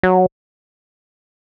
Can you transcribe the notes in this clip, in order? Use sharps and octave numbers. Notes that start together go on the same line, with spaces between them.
F#3